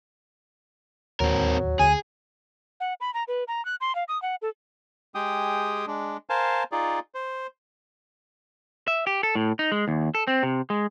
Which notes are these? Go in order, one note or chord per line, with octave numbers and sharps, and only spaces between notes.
D1 D#2 F#3 C4 A#4
D2 D3 G#4 G#5
F#5
B5
A#5
B4
A#5
F#6
C6
F5
D#6
F#5
A4
G#3 G4 G#4 G5 D#6
G#3 D4
A#4 C5 F5 G#5 A5
D#4 F4 G#4 D5
C5
E5
G4
A4
A2
D#4
G#3
D#2
A4
C4
C3
G#3